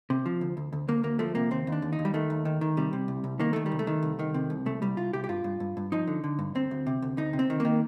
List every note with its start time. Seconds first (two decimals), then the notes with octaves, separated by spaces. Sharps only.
0.10 C3
0.26 F3
0.41 D2
0.57 D2
0.73 D2
0.88 D2 A#3
1.03 D2 A#3
1.19 F3 A3
1.35 C3 A#3
1.51 D#2 C4
1.67 D#2
1.72 D4
1.82 D#2
1.93 D#4
1.99 D#2
2.05 G3
2.14 D#3 A3
2.30 D#2
2.45 D#3
2.61 D#3
2.77 C3 G3
2.93 C3
3.08 C2
3.24 C2
3.40 D#3 A#3
3.53 D#3 A3
3.66 G3
3.72 C2
3.79 A3
3.87 D#3
4.02 C2
4.19 D#3
4.34 C3
4.50 C2
4.66 C2 A3
4.82 C2 G3
4.97 C2 F4
5.13 C2 G4
5.24 G4
5.29 G2 F4
5.44 G2
5.60 G2
5.77 G2
5.92 F3 D#4
6.07 D3
6.24 D3
6.39 G2
6.55 D2 C4
6.71 D2
6.87 C3
7.02 D2
7.17 D2 D#4
7.33 C3
7.39 C4
7.50 D#3
7.60 D#3 A#3